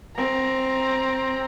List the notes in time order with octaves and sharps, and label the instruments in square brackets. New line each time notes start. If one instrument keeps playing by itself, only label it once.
[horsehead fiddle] C4 A#5